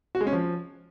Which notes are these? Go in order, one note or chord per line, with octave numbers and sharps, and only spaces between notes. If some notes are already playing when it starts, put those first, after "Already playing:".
F#4
G#3
C#4
F3